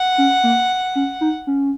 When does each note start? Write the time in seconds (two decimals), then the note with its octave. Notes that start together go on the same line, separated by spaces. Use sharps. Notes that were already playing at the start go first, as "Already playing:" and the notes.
Already playing: F#5
0.18 C#4
0.44 A#3
0.95 C#4
1.21 D#4
1.47 C#4